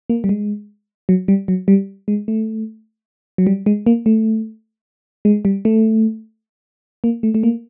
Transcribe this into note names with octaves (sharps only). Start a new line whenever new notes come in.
A#3
G3
G#3
F#3
G3
F#3
G3
G#3
A3
F#3
G3
G#3
A#3
A3
G#3
G3
A3
A#3
A3
A3
A#3